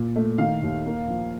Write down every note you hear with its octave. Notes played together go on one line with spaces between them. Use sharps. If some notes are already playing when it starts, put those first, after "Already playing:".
Already playing: A#2
A3
D#3 F5
D#2
A#3
F3